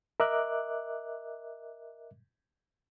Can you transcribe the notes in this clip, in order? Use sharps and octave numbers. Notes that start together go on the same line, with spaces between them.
A#4 D#5 E5 D6 F#6